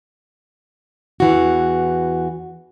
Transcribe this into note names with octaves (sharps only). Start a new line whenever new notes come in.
E2 E3 F#4